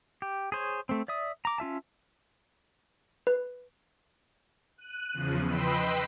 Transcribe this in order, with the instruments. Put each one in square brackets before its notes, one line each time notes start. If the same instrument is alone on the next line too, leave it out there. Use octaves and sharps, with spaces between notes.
[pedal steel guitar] G4
G#4 C5 C#5
A3 C4
D5 E5 D#6
A#5 D6
C#4 F4 E5 A5
[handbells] B4
[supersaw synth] F#6 D#7
E2 C#3 F3
B4 D#5 G5 B5 C6 E6